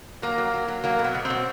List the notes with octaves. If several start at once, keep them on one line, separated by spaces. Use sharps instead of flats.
F#3 A#3
F#3
F#3
F#3
F#3 A#3
B2
B3
B2
C4
B2